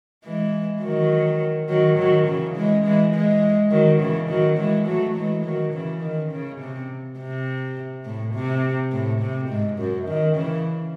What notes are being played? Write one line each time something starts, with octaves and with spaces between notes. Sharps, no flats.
E3 G#3
D#3 F#3
D#3 F#3
D#3 F#3
C#3 E3
E3 G#3
E3 G#3
E3 G#3
D#3 F#3
C#3 E3
D#3 F#3
E3 G#3
F#3 A3
E3 G#3
D#3 F#3
C#3 E3
D#3
C#3
C3
C3
A2
C3
A2
C3
G#2
F#2
D#3
C#3 E3